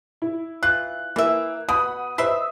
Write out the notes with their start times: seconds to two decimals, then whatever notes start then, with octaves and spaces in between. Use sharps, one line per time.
0.22 E4
0.63 E3 F4 F#6
1.16 E3 A#3 E5
1.69 B2 F#5 B5 D#6
2.18 B4 C5 D#5 E5 E6